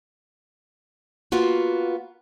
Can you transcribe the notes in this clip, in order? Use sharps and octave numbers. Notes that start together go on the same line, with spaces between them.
A#3 B3 F4 F#4